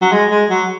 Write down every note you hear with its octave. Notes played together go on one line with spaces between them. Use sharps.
F#3
G#3
G#3
F#3